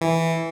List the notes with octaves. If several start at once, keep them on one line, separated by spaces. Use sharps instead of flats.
E3